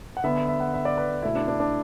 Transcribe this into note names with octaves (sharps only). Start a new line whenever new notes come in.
F#5
D3 B3 E5
E5
F#5
E5
D5
B4
B2 A3 E4
D4
D4
D4